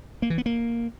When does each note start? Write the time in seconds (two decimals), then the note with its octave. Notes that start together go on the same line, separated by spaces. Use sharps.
0.22 A#3
0.30 E3
0.38 B3
0.46 A#3